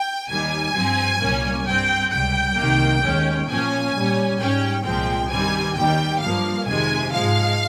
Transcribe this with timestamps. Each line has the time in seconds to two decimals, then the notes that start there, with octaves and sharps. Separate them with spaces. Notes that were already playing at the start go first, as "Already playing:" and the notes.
Already playing: G5
0.29 D#2 D#3 G3 G#5
0.75 G2 F3 C4
1.20 C2 A#2 G3 A#3 C#4
1.66 G2 G3 C4 G5
2.11 C#2 C3 G3 G5
2.56 C2 C3 D#3 A#3
3.02 D#2 D#3 G#3 C#4
3.48 A#2 F3 A#3 C#4 G#5
3.94 A#2 G3 C#4
4.39 G#2 G3 C#4 G5
4.85 C2 A#2 F3 G#3 C4 G5
5.30 G2 D#3 G3 C4 G#5
5.76 D#2 D#3 G3 G5
6.21 G2 F3 A#3 F5
6.66 F2 C3 D#3 G#3 G#5
7.12 G#2 F3 G#3 F5